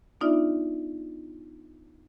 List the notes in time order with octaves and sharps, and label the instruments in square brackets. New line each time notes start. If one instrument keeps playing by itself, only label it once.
[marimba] B3 D4 D#4 F4 D5 E5